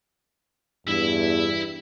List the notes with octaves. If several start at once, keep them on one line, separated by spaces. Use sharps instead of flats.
E2 G2 E4 E5